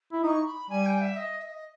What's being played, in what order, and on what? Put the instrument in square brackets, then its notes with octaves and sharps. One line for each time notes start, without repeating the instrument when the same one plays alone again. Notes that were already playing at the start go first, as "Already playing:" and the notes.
[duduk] E4
[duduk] D#4 [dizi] C#6 D#6
[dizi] B5
[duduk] G3 [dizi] G#5
[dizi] G5
E5
D#5
E5
D#5